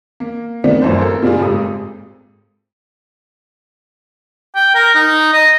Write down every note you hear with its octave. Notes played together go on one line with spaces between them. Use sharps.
A#3
C3 D#3 F3 A3 B3 D4
G1 C2 F#2 A2 C5
A4 A#4
A#2 C#3 G3 A#3 F4 G#4
G#1 G#2 G4 A4 D#6
G5
A#4
D#4
D#5